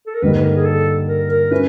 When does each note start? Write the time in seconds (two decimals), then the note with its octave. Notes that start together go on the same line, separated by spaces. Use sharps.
0.07 A4
0.14 A#4
0.22 G2 D3 G3 A#3 D#4 B4
0.34 B4
0.44 A#4
0.56 G#4
0.65 A4
1.08 A#4
1.30 A#4
1.51 C#4 E4 B4